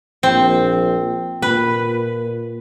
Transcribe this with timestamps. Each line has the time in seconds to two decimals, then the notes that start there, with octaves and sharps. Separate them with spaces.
0.23 A#1 C4
1.42 A#2 B4